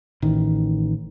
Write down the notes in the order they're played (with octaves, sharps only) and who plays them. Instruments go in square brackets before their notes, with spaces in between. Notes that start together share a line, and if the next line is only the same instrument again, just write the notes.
[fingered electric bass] A1 D#3